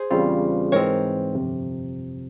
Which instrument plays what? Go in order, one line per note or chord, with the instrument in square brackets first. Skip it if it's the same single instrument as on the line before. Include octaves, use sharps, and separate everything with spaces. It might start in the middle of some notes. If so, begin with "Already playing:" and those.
Already playing: [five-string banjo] G#4 C5
[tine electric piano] E2 C#3 G3 C4 F4
[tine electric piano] G#2 E3 G#3 C4 [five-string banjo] A#4 C#5
[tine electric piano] G1 F2 C3